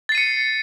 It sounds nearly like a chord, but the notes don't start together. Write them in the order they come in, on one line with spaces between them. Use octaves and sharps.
A6 C7 D#7 C#7